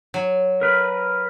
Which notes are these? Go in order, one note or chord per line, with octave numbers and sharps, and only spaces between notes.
F#3
A#4 B4